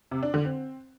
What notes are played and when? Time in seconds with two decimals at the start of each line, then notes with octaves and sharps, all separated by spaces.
0.11 C3
0.23 D4
0.34 D3
0.45 C4